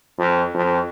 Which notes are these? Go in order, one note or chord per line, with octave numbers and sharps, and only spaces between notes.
F2
F2